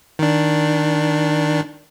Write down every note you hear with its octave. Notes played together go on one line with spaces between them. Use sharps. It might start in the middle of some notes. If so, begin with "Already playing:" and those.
D#3 D4